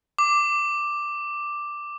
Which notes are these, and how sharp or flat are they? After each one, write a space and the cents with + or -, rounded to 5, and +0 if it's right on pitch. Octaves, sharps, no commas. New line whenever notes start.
D6 +5